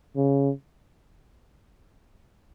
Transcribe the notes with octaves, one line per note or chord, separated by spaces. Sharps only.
C#3